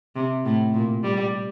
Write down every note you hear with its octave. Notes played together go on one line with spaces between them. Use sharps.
C3
A2
A#2
G3